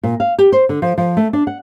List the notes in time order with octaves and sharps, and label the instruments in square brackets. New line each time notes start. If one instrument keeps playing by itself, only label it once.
[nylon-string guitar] A#2
F5
G4
C5
D3
F3
F3
A3
D4
F#5